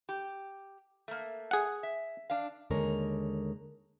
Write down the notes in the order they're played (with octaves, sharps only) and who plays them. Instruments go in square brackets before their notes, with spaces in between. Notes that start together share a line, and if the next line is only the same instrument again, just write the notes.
[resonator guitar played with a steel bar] G4
A3 A#3
[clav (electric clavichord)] G#4 F#5
[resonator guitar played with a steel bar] E5
D4 F5
[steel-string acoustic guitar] D#2 D3 G#3 A#4 C#5